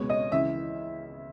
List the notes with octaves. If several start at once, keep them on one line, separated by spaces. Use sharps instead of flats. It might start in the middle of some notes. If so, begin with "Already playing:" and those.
Already playing: C#2 B2 G#3 B3 C#5
D#5
C#2 C#3 E3 E5